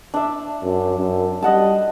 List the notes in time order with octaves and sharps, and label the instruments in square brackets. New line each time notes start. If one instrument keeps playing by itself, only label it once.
[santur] D4 E5
[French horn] F#2
F#2
[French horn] G3 [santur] D#5 F#5 A5